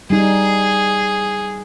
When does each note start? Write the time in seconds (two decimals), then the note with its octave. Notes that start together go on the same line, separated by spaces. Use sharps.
0.10 G3 D#4 G#4